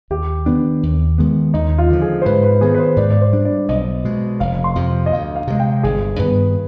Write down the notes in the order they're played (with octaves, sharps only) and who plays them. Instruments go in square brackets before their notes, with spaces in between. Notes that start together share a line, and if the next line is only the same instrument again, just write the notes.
[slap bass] D#2 [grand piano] G4
[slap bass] D#3 B3 D4
D#2
D#3 G#3 B3
[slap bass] D#2 [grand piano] D#4
[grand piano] F4
[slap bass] D3 F3
[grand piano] G#4
C5
[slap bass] G#2 [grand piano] B4
[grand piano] B4
[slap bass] D#3 B3 [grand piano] G#4
[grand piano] B4
C5
[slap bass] G#2 [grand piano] D5
[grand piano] D5
C5
[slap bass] G3 D4
[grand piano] D5
[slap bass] B1 [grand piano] D#5
[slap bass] B2 G#3
[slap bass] F1 [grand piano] F5
[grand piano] C6
[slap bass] F2 C3 F3
[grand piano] D#5
[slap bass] D2 [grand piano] F5
[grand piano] F5
[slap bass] C3 F3 G#3
[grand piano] G5
[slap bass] G1 [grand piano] G#4
[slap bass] G2 D#3 B3 [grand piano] B4